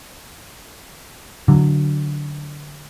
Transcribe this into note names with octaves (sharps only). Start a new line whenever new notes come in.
D3 F#3